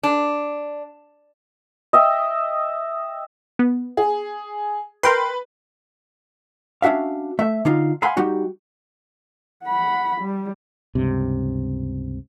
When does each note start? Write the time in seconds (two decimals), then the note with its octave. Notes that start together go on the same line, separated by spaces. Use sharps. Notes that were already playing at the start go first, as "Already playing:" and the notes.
0.03 D4
1.93 D#5 E5 G5
3.59 B3
3.97 G#4
5.03 A#4 B4 G5 C6
6.82 C#4 D4 F#4 E5 F5
7.39 A3 E5
7.65 D3 D#4 F4
8.02 F5 F#5 G#5 B5 C6
8.17 G3 D#4 F#4 G4
9.64 F#5 B5
10.21 G3
10.95 C#2 G2 C3